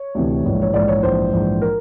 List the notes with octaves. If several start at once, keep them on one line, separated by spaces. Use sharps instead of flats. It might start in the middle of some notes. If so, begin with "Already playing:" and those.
Already playing: C#5
D2 C3 E3
A#1 G#2 E3
C#5
A#1 G#2 E3 D5
C#5
A#1 G#2 E3 C5
A#1 G#2 E3
A#4